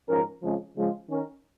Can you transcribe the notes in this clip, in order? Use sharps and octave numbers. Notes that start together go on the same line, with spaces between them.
G#2 F3 C#4 A#4
F2 C#3 F3 G#3
C#3 F3 G#3 F4
D#3 C#4 A#4